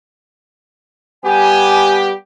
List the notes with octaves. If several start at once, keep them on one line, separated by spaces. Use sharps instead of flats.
G3 B3 G4 G#5